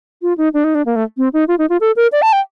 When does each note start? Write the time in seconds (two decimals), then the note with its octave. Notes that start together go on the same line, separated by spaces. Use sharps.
0.22 F4
0.37 D#4
0.54 D4
0.64 D#4
0.75 D4
0.86 A#3
0.96 A3
1.17 C4
1.33 D#4
1.48 F4
1.58 D#4
1.70 F4
1.80 A4
1.96 A#4
2.12 D5
2.22 A5
2.33 G5